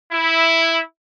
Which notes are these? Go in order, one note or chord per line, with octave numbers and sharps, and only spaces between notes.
E4